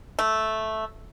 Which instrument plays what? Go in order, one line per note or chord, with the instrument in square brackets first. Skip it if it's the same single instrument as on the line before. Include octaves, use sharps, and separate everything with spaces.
[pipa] A3